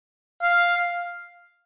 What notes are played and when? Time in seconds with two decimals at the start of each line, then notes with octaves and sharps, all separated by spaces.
0.42 F5